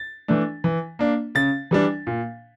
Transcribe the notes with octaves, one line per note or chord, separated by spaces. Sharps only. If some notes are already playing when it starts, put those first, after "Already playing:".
Already playing: A6
E3 A3 D4
E3
A#3 D4
C#3 A6
E3 G3 D4
A#2